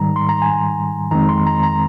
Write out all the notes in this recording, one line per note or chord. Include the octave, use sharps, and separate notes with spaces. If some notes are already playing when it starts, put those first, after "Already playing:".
Already playing: G#2 D#3 G3 A#5
C6
A#5
G#5
F2 D#3 G#3 C4 A#5
C6
A#5
A#5